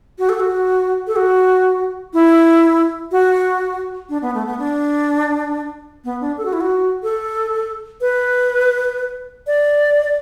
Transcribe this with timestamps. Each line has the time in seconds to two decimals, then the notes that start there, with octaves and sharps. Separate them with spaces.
0.19 F#4
0.29 A4
0.40 F#4
1.07 A4
1.16 F#4
2.14 E4
3.12 F#4
4.09 D4
4.22 B3
4.34 A3
4.46 B3
4.59 D4
6.05 B3
6.21 D4
6.38 A4
6.45 F#4
6.53 E4
6.61 F#4
7.03 A4
8.01 B4
9.47 D5